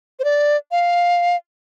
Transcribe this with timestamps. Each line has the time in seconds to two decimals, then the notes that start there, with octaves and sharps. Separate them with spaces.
0.19 C5
0.24 D5
0.71 F5